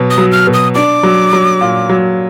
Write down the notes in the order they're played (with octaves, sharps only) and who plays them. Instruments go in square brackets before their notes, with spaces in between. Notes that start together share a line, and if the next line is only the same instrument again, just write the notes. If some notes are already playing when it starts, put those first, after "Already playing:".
Already playing: [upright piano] B2 F#3
[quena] D#6
[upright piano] F#3
[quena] F6
[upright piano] B2
[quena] D#6
[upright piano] D4 [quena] D6
[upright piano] F#3
F#3
A#2
F#3